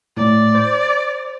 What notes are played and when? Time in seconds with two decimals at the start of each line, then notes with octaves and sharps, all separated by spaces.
0.17 A2 D5
0.55 C5